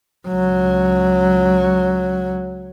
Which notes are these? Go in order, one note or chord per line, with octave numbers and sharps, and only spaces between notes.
C#2 F#3